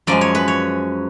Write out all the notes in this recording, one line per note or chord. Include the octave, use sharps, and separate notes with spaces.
F#2 F3 G#3 D5
C#5
B4
C#5